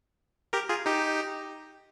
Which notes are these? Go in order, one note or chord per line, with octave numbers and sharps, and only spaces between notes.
G4 A#4
F4 G#4
D#4 G4